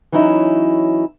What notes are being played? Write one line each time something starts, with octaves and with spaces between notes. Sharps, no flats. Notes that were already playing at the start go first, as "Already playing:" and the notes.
E3 F#3 C#4 D#4 E4